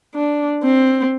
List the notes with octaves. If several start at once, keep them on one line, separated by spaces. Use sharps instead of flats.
D4
C4